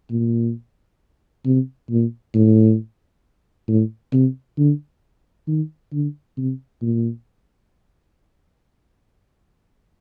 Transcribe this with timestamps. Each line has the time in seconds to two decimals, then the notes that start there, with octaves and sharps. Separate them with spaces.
0.10 A#2
1.45 C3
1.90 A#2
2.34 A2
3.68 A2
4.13 C3
4.58 D3
5.47 D#3
5.92 D3
6.37 C3
6.82 A#2